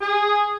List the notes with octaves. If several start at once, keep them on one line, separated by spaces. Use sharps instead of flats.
G#4